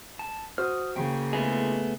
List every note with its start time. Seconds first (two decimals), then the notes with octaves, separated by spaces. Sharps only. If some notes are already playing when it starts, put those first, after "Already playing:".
0.19 A5
0.58 F#4 C5 D#6 F6
0.96 C#3 A#3 G5
1.33 A3 B3 E4 F4 G#4 D#5